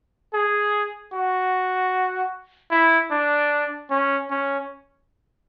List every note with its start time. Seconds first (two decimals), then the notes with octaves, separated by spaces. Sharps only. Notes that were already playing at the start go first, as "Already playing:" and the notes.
0.34 G#4
1.13 F#4
2.71 E4
3.11 D4
3.90 C#4
4.30 C#4